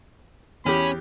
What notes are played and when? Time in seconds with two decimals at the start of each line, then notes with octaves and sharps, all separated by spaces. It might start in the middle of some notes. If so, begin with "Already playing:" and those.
0.66 E2 C#4 G4 B5